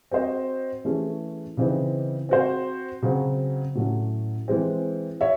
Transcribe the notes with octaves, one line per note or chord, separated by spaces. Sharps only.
C4 F#4 C5 D#5
E3 A3 C#4 G#4
C#3 E3 C4 D#4
C4 F#4 C5
C#3 F#3 C4 F#4
A2 F#3 A3 C#4
E3 G#3 C4
C#5 E5